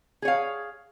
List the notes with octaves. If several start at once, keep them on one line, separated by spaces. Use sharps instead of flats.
G#4 C#5 F5